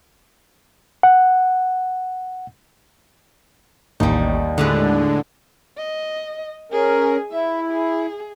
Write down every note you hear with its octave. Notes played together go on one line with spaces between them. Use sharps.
F#5
A1 D#2 G3 D#4
A2 D3 G#3 D4 B4
D#5
C#4 G#4 A#4
E4 E5
G#4